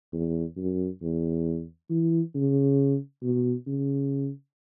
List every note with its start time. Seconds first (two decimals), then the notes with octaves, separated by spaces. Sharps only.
0.13 E2
0.57 F#2
1.02 E2
1.90 E3
2.35 C#3
3.22 B2
3.67 C#3